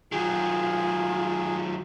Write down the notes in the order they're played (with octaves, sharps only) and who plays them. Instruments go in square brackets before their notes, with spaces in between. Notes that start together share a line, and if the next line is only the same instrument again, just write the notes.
[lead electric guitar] D#3 F#3 [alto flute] F4 [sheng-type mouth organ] G#4